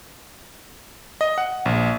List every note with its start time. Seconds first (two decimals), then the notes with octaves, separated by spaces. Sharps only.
1.21 D#5
1.38 F#5
1.65 A#1